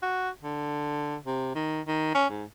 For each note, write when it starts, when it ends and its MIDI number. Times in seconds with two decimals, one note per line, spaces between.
0.03 0.30 66
0.43 1.16 50
1.26 1.52 48
1.55 1.81 51
1.87 2.12 51
2.14 2.26 61
2.30 2.44 44